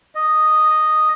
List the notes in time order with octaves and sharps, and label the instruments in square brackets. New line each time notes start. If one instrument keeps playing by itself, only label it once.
[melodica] D#5